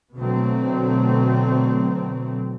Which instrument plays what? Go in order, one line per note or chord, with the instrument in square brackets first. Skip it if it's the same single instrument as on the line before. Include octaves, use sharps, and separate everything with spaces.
[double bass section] B2 D3 F#3 A3 C4